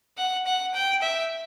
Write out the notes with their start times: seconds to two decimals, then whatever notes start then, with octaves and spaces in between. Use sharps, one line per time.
0.17 F#5
0.46 F#5
0.74 G5
1.02 E5